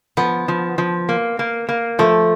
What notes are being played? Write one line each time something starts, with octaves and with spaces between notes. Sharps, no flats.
F3 B3
F3
F3
A#3
A#3
A#3
F3 A3